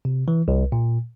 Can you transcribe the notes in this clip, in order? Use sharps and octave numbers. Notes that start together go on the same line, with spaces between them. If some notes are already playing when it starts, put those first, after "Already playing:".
C3
E3
C2
A#2